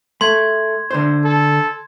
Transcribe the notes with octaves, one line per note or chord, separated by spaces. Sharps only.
A3 C6 G#6
D3 C5
A4